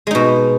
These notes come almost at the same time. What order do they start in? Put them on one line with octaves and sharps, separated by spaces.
G#3 D#4 B2